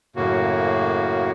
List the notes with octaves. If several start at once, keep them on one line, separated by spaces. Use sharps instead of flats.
F#2 A2 C#3 A#3 F#4